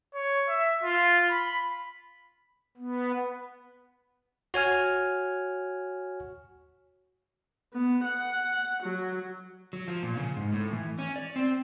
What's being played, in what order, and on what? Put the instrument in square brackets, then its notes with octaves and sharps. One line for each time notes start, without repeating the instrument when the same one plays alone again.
[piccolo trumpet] C#5
E5
F4
B5
[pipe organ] B3
[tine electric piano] F#4 C#5 G#5 F6
[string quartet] B3
F#5
F#3
[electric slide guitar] F#3
F3
A#2
C#3
G#2
A2
E3
C#4
D5
C4